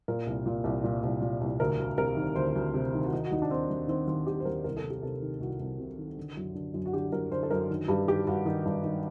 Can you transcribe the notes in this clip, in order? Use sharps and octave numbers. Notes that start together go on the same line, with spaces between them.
A#2 A#4
C2
A#2
C2
A#2
C2
A#2
C2
D2 A#4
D2
C3 A#4
D#3
D2 C5
D2
C3
D#3
F#4
D#3 D#4
F#4
D#2 D#4
D4
D#3 C4
D#2
D#3 C4
D#2 C4
D#3 G4
C5
D#2 A#4
C2 A#4
A4
C2
G4
C3 A4
D#3
C2 F#4
C2
C3
D#3
D3
F#2
D3
F#2
F#4
D3 G4
F#2 A#4
D3 C5
A4
F#2 A#4
D#3
G2 G4
D#3 G4
G2 F#4
D#3 D#4
G2
D#3